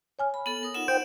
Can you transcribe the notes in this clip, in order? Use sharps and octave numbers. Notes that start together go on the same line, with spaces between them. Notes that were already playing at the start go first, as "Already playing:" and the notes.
C#5 G#5 F6
B5
B3 A4 F#7
A#4 D#6
D#4 F4 F#5 E7
C5 G5 D7